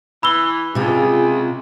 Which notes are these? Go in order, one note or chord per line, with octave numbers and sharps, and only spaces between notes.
E3 B5 E6 G7
C#2 C3 F4 G#4